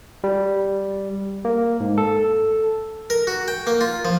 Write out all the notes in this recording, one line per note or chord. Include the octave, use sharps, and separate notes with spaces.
G3
A#3
G#2
A4
A#4
F#4
G5
A#3
F4
F3